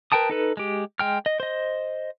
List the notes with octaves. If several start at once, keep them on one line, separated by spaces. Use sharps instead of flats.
A#4 B4 G5 A5 D#6
D#4 A4 B4
G#3 G4
G#3 G5 F6
D#5
C5 D#5